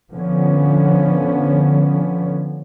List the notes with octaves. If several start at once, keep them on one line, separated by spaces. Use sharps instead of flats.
D3 F3 B3 C#4